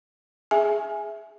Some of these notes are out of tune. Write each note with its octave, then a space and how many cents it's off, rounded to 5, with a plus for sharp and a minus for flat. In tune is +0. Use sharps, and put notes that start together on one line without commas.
G#4 +0 E5 +0 G#5 +0